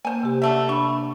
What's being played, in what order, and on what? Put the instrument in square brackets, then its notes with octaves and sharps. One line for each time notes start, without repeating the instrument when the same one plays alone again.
[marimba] A#3 [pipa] C5 G#5
[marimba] C3 G4
[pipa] D3 A3 E5
[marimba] D4 B5 [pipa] C#6